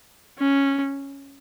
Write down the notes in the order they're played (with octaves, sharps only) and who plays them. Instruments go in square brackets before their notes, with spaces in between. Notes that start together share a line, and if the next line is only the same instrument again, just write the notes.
[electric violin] C#4